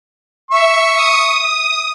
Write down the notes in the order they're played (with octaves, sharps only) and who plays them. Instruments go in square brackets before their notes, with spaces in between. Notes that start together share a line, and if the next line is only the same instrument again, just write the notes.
[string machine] E5 [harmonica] C#6
[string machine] D#6